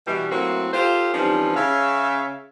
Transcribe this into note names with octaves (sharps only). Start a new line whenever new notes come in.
B2 E3 G3
F#3 A3 A#3 C4 E4 F#4
F4 G4 A4 C5
E3 F3 G3 C4 C#4 D#4
C#3 E5 F5